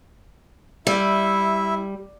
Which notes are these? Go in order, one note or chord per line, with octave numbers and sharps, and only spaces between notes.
G3 E4 E5